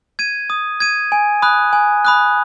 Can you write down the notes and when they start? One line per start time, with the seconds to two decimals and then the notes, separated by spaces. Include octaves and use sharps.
0.19 G#6 D#7
0.50 D#6
0.80 G#6 D#7
1.12 G#5
1.42 B5 D#6 F#6
1.73 G#5
2.05 B5 D#6 F#6